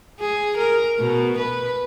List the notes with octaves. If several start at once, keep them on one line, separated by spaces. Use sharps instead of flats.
G#4
A#4
B2
B4